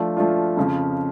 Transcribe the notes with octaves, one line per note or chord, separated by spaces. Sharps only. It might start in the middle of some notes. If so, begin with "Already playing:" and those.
Already playing: F3 A3 D4 F4
F3 A3 D4 F4
F2 C#3 F3